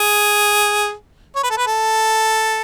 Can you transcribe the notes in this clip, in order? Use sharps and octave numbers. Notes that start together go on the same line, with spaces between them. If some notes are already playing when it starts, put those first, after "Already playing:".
Already playing: G#4
C#5
B4
A4
B4
A4